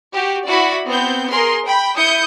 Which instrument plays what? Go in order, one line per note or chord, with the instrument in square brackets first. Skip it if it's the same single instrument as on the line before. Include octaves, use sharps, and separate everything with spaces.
[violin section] F#4 G4
E4 F#4 D5 B5
B3 C4 G6
G#4 A#4 C6
G5 B5
E4 D#6 G6 C#7